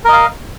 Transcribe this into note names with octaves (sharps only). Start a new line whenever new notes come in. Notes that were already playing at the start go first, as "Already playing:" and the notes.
A#4 D#5 F5